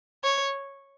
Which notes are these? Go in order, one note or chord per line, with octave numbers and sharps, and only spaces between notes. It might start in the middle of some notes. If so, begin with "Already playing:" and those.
C#5